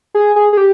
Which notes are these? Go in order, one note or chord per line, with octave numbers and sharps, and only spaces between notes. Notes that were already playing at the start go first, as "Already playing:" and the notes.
G#4
G#4
G#4
G4